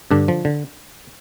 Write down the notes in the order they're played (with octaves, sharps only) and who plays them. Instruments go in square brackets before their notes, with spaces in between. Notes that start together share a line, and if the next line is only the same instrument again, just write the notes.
[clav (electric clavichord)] G2 D3 D4
F3
D3